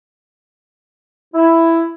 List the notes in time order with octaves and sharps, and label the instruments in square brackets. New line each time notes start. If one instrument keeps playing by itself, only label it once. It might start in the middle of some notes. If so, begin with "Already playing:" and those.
[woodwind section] E4